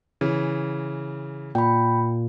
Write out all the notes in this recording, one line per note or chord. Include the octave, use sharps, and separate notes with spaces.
C#3 E3
A#2 G5 B5